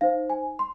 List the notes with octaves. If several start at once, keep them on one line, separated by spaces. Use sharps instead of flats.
D#4 C5 F5
G#5
C6